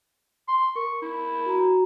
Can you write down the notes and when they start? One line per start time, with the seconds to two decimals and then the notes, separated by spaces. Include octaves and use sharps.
0.48 C6
0.75 A#4 C#6
1.02 E4
1.46 F#4 A#5